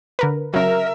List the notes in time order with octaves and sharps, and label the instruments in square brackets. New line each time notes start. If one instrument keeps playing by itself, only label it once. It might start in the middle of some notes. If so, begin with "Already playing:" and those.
[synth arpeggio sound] D3 A#4 B4
[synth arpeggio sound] C#3 F#3 [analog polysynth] A#4 [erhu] E5